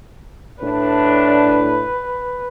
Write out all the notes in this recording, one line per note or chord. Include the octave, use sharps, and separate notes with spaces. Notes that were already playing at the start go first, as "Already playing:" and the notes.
A2 D4 B4